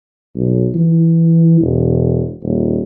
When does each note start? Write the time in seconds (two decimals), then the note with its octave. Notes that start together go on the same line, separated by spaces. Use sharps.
0.35 B1
0.75 E3
1.60 E1
2.42 D#1